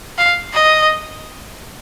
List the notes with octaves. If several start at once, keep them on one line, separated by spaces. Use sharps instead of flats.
F5
D#5